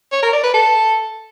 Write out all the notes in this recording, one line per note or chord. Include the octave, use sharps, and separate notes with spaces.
C#5
A#4
D5
B4
A4